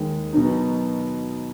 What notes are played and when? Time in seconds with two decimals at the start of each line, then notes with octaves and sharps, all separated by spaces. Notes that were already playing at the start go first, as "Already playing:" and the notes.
Already playing: D#2 D#3 G#3
0.33 B2 F#3 B3 D#4